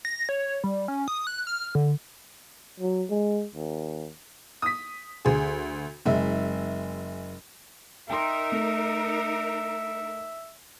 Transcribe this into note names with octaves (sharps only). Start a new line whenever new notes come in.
A#6
C#5
G3
C#4
D#6
F#6
F6
D3
F#3
G#3
D#2
D#6 B6
D2 G#4
F#1 G#3 E5
D#4 A#4 E5 G5 C6
A3